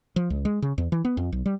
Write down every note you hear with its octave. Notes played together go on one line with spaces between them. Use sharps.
F3
C#2
G#3
C#3
E2
E3
B3
F2
B1
G3